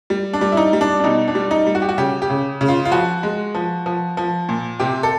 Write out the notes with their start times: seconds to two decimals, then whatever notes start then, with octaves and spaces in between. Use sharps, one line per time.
0.10 G3
0.33 D4
0.41 G3
0.52 E4
0.57 D#4
0.73 G3
0.81 D4
1.00 D4
1.04 B2 D#4
1.28 D4
1.35 G3
1.51 D#4
1.67 G3
1.75 F#4
1.82 G4
1.89 F#4
1.98 C#3 G4
2.22 G4
2.30 C#3
2.61 C#3
2.68 F4
2.85 F4
2.92 F3 F#4
3.23 G#3
3.55 F3
3.86 F3
4.17 F3
4.49 A#2
4.79 C3 G4
5.03 A4